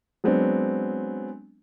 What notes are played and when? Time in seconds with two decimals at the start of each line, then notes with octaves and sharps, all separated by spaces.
0.24 F#3 G#3 B3 C4 D4